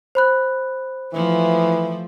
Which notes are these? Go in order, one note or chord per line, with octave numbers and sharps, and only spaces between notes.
C5 B5 F#6
E3 F3 A3